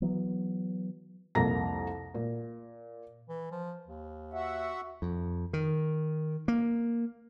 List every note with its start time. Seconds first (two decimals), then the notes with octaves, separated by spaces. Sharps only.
0.02 E3 F#3 B3
1.35 C2 F2 A#3 A#5 A#6
2.14 A#2
3.29 E3
3.51 F3
3.87 D#2
4.33 F#4 E5 F#5
5.02 F2
5.53 D#3
6.48 A#3